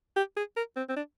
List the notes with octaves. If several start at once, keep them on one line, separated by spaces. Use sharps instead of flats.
G4
G#4
A#4
C4
C4
D4